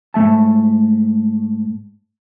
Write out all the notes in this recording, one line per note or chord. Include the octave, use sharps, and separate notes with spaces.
G#2 A3 E5 A5